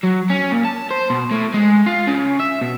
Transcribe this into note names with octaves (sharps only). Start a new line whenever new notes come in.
F#3
C#4
A#2
A5
C5
B2
A2
G#3
F4
C#3
E5
B2